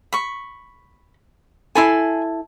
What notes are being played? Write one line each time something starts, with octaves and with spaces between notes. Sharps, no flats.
B5 C#6
E4 A4 G#5 B5 C6